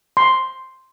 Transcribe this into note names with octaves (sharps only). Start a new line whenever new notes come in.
C6